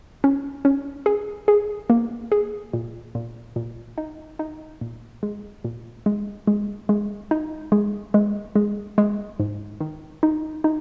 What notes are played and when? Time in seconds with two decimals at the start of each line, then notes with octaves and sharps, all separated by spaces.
0.24 C#4
0.65 C#4
1.06 G#4
1.48 G#4
1.90 A#3
2.32 G#4
2.73 A#2
3.15 A#2
3.56 A#2
3.98 D#4
4.39 D#4
4.81 A#2
5.23 G#3
5.65 A#2
6.06 G#3
6.47 G#3
6.89 G#3
7.31 D#4
7.72 G#3
8.14 G#3
8.56 G#3
8.98 G#3
9.40 G#2
9.80 D#3
10.23 D#4
10.64 D#4